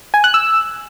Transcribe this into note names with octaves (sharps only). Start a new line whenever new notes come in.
G#5
F#6
E6